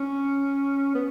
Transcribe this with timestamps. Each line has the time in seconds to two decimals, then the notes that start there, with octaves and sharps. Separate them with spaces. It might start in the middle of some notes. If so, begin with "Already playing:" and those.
Already playing: C#4
0.95 B3